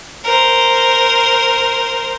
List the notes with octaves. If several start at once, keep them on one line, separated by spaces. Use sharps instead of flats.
A#4 C5